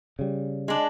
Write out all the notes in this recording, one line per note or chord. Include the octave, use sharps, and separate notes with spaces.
C#3 G3
G#3 D4